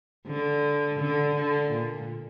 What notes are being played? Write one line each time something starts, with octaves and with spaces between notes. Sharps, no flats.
D3
D3
D3
A#2